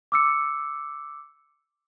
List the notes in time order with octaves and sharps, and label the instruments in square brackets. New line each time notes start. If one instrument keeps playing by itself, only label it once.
[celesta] D6 E6 C#7